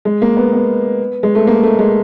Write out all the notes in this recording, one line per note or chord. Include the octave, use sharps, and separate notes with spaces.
G#3
A#3
B3
B3
G#3
A3
A#3
A3
G#3